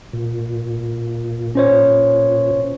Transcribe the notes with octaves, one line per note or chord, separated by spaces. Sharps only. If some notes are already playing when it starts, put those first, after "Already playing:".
A#2
C#4 C5 C#5